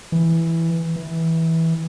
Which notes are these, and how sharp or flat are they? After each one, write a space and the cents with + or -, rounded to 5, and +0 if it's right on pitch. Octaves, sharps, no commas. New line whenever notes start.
E3 +0
E3 -15